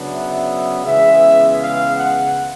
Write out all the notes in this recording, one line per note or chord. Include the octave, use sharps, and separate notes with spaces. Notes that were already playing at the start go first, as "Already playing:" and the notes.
Already playing: C#3 F#3 B3 D4
E5
C#3 E3 G#3 B3 E5
F5
F#5